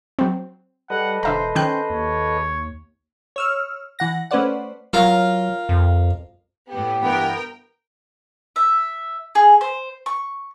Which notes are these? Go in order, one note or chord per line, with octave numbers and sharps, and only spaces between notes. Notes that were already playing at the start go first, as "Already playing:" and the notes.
F#3 C4
G3 A4 B4 D#5 F#5
E1 D3 C5 E5 A#5
D#3 C#4 C5 G5 F#6
D#2 C#5
C#5 E6 F6
E3 F#5 A#6
A3 C#4 B4 C5 D5 F#5
F#3 F4 A#4 F5
F2
A2 B3 G4
G2 E3 B3 A#4 G5
E5
G#4
C5
C#6